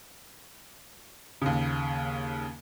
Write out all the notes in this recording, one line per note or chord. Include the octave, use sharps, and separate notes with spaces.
D#2 C#3